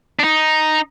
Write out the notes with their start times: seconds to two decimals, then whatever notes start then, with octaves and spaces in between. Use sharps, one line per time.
0.19 D4
0.24 D#4